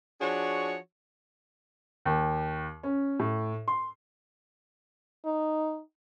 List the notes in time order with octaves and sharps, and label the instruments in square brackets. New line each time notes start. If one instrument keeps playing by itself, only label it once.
[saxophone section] F3 D4 F#4 G#4 C#5
[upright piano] D#2
C#4
A2
C6
[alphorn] D#4